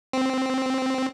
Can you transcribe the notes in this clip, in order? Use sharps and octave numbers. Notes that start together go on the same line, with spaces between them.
C4